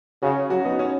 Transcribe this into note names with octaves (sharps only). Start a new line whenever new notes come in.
C#3 C#4 F#4
F#3 C#4 F#4
B3 D#4
C#4